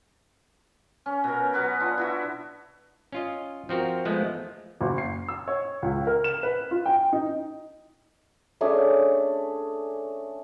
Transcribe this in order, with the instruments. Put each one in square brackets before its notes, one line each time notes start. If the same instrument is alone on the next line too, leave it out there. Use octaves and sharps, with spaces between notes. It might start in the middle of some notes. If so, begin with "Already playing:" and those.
[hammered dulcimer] C#4
B2 A#4
F#3 B3 F#4 B4
D4 F4
E4 F#4 E5
[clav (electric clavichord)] C#4 F4 D#5
F3 C4 F#4 A#4
F3 G#3 A3 B3
[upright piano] F#1
C7
E6
C#5
C#2
A#4
E7
B4
F4
G5
D#4
[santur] A3 C#4 D4 G#4